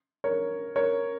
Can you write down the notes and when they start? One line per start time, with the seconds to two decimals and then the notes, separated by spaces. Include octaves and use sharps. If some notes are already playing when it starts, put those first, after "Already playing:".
0.24 A#4 C#5
0.76 A#4 C#5